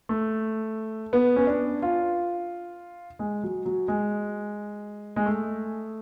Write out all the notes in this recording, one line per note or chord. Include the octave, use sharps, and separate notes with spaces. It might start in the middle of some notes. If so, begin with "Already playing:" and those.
A3
B3
C#4
D4
F4
G#3
F#3
F#3
G#3
G#3
A3